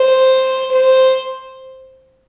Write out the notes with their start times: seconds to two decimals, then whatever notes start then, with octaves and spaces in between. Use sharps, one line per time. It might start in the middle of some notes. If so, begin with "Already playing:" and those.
Already playing: C5
0.72 C5